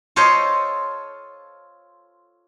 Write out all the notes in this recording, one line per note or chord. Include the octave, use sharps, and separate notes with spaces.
F4 A4 C5 C#5 D#5